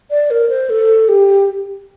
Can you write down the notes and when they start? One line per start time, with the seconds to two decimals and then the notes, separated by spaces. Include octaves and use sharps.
0.10 D5
0.31 A#4
0.49 C5
0.70 A4
1.09 G4